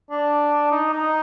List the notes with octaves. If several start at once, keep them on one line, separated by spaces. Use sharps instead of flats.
D4
D#4
D#4